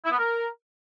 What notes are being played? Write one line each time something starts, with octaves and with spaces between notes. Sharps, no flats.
E4
B3
A#4